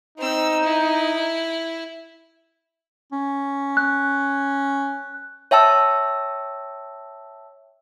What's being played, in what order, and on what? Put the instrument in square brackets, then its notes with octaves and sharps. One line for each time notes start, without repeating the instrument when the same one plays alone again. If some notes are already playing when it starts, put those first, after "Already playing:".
[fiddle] C4 E6 [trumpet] D#4
[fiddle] E4
[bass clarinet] C#4
[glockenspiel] F#6
[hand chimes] C#5 E5 G5 A5 E6